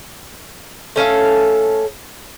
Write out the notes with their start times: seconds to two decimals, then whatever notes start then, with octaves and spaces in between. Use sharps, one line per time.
0.96 A3 C#4 A4 F5